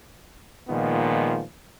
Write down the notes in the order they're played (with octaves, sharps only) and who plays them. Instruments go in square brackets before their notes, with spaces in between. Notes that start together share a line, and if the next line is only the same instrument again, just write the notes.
[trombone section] A#2 D#3 F3 G#3 B3